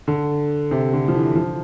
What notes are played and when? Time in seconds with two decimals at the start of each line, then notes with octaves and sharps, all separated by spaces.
0.08 D3
0.71 C3
0.93 D3
1.08 F3
1.15 E3
1.35 F3